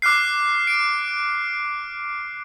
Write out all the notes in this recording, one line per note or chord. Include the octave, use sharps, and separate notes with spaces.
D6 F6 F#6 C7
D7